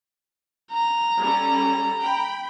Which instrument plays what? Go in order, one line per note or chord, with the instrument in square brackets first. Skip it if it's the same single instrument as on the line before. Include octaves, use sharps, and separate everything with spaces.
[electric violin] A#5
[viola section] G3 C#4 A4
G5 B5